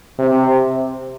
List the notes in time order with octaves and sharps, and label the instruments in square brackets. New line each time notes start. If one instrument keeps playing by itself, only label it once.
[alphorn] C3